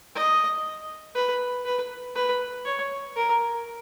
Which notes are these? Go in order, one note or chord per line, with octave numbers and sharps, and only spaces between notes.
D#5
B4
B4
B4
C#5
A#4